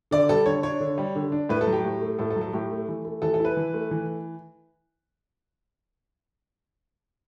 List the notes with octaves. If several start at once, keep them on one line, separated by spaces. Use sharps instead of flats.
D3 D5
G3 A4
D3 C#5
D4 C#5
D3
G3
D3
D4
A2 B4
A4
F#3
G4
A2
A3
A2 A4
A4
F#3
A4
A2 G4
A3
E3
A3
E3 A4
A4
E4
B4
E3
A3
E3